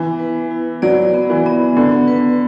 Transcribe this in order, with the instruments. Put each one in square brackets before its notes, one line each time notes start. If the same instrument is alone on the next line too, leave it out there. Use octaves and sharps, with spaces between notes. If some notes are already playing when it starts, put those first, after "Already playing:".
Already playing: [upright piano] E3 [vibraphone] B3
[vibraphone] B4
E4
[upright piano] F#3 [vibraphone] D5
[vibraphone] B3
[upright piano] E3
[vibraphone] B3
[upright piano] D3 [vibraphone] B3
[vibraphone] B4